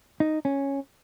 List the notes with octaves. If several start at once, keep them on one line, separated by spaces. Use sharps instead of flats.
D#4
C#4